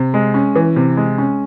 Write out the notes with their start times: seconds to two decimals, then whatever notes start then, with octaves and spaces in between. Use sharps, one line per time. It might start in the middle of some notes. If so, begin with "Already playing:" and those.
Already playing: C3
0.14 G#3
0.34 C#4
0.56 E3
0.76 C3
0.97 G#3
1.18 C#4